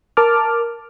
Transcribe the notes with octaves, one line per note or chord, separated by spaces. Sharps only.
A#4 A5 D6 F6